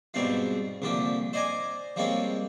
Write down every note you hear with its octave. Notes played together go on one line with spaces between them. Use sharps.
G#2 B2 G3 C4 D4 F4
C2 A#2 D3 F3 G4
C5 D5 D#5 G#5 A#5 D6
F3 G3 G#3 A#3 C4 C#5